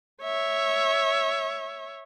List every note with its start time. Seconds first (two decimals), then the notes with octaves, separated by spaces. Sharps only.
0.23 C#5 E5